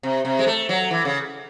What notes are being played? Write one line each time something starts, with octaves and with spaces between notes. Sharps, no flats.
C3
C3
G#3
A3
F#3
E3
C#3